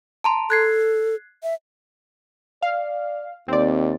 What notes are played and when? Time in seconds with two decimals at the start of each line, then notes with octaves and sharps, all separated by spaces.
0.24 A5 A#5 C6
0.50 A4 F#6 G#6 C7
1.43 E5
2.62 D5 F5
3.48 D#2 C4 D5